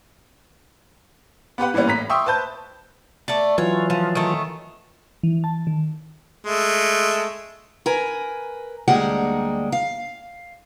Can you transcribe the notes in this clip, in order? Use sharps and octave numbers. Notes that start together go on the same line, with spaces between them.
B3 G4 B4 F#5
E3 G3 A#3 B3 C#4
A2 A#5 B6
E5 G5 C6 C#6 D#6 E6
B4 C5 A5 G6
A3 D5
E3 F#3 F4 C#5
F3
D#3 A3
E3
A5
D#3
G#3 A3
A#4 B4 G#5
D2 G3 G#3 A#3 F#5
F5